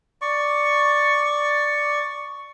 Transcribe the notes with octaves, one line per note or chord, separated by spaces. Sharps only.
D5 C#6